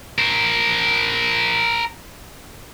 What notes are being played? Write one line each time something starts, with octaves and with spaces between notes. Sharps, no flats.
A#4 C5